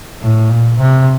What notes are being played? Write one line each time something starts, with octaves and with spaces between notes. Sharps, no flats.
A2
A#2
C3